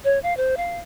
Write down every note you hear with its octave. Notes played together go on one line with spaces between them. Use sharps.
C#5
F5
C5
F5